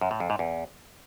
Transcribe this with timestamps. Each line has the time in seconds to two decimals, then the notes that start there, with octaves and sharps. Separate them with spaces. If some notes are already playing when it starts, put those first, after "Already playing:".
0.01 F#2
0.11 A2
0.20 F2
0.30 G#2
0.39 E2